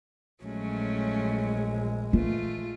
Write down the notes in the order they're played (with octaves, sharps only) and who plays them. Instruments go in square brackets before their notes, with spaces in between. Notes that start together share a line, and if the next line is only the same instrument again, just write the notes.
[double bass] A#1 G#3 [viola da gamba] F#3 A3 C#4
[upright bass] E3 [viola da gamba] A3 F4